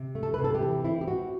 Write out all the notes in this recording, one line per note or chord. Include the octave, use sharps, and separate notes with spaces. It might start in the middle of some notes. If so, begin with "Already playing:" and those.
Already playing: C3
A3
A4
C3 B4
A4
G4
E3
C4 E4
G4
C4 F#4